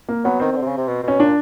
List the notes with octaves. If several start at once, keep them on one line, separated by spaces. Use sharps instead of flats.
A#3
F#3 B3
D#3 C4
D#3
D3
C3
C#3
C3
B2
B2 C#4
A#2 D4